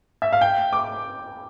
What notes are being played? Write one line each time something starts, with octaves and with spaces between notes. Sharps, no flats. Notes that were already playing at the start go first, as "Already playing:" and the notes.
E5
F5
G5
D6